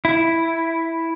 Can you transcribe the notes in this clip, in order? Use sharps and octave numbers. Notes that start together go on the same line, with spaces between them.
E4